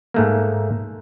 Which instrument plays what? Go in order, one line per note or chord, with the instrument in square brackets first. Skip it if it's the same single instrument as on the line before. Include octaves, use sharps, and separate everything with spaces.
[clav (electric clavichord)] G#2 A3 A#3